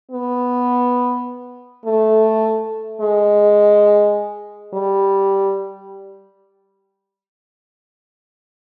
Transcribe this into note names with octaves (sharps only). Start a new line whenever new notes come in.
B3
A3
G#3
G3